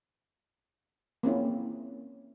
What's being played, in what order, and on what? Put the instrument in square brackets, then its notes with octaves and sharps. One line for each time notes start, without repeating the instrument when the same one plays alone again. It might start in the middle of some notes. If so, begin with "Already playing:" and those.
[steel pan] A#3 C4 C#4 E4